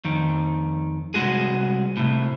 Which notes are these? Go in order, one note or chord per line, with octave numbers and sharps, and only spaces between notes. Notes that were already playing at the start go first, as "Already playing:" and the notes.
F2 D#3
C2 A#2 G#3 F#4 G#4
A2 C3